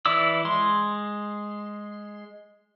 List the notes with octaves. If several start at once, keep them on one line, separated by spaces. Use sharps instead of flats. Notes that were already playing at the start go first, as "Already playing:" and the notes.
E3 E4 D5 D6 E6
G#3 C6